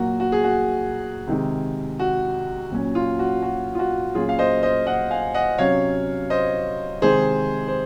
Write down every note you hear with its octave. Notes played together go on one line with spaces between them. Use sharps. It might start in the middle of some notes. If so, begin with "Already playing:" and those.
Already playing: A#2 F#3 A#3 F#4
F#4
G#4
F#4
C3 D#3 G#3
F#4
A#2 F#3 C#4
F4
F#4
F#4
F4
F#4
A#2 F#3 C#4 F4 G#4
F5
C5 D#5
C5 D#5
D#5 F#5
F5 G#5
D#5 F#5
C3 F#3 C#4 C#5 F5
C5 D#5
C3 D#3 G#3 G#4 C5
C5